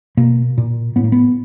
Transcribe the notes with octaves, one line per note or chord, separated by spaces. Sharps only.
B2 A#3
A#2
A2 B3
A#3
B3